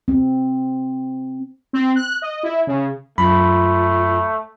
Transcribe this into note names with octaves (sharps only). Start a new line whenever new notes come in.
C4
C4
F#6
D#5
E4
C#3
F#2 A3 F4 B5